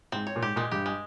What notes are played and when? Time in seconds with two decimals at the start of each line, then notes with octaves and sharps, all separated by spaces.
0.12 G#2 C4
0.27 C#5
0.36 A#2
0.42 G#2 G4
0.56 A#2 G#3
0.71 G2 G4
0.86 G#3